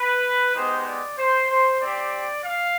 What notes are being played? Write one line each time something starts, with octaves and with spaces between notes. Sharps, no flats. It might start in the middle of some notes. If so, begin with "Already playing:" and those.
Already playing: B4
G#3 B3 D#4 G4 C5
D5
C5
C5
C4 G4 D5
F5